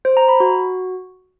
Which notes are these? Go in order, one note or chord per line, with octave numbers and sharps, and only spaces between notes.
C5
A#5
B5
F#4